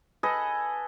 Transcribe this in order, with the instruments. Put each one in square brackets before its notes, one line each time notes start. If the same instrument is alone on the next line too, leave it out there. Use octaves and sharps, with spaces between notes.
[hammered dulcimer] A4 B4 D#5 G#5